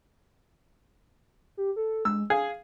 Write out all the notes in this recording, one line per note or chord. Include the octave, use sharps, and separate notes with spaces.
G4
A4
G#3 E6
G#4 F5